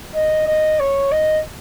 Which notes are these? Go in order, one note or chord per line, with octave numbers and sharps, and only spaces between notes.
D#5
D#5
C#5
D#5